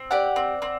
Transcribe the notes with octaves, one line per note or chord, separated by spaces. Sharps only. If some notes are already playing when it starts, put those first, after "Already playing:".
Already playing: C4
G4 D5 F#5
C4
C4